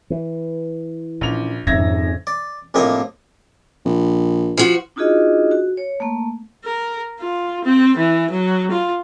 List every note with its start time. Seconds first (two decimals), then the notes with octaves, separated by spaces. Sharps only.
0.10 E3
1.21 A#1 C#3 F7
1.67 G#1 F2 C#3 D#4 E5 G#6 A#6
2.27 D5
2.74 A#1 A2 C3 A#3 D#5 G5
3.85 A#1
4.57 F3 F#4
4.96 D4 D#4 F4 F#4 G#4 D#5
5.51 F#4
5.77 C#5
6.00 A3 A#3
6.64 A#4
7.20 F4
7.65 C4
7.97 E3
8.31 F#3
8.71 F4